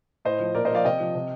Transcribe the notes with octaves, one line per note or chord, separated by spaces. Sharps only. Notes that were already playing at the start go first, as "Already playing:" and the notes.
A2 C5 D#5
F3
A#2 A#4 D5
C5 D#5
F3 D5 F5
C3 D#5 G5
F3
C3